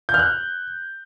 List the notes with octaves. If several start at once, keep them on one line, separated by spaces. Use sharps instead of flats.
G6
F6
F#6